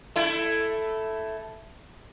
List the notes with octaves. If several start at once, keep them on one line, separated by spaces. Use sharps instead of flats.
A3 E4